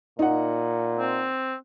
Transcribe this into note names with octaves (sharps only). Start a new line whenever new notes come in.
A#2 D#4 F#5
C4